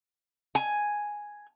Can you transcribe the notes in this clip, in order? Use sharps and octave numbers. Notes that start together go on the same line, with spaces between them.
G#5